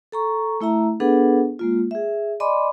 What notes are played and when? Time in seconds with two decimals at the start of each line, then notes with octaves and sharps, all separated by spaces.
0.12 A4 A#5 C#6
0.61 A3 E4 E5 A#5
1.00 B3 D4 G#4 A4 B4 F#5
1.59 G#3 A#3 F4
1.91 G#4 E5
2.40 D5 D#5 G#5 B5 C6 D6